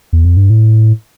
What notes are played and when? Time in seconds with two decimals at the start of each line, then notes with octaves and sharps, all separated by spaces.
0.13 E2
0.25 F2
0.37 G2
0.50 A2